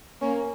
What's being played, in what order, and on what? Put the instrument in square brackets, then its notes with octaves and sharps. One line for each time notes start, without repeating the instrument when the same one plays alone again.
[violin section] A#3 [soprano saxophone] C#4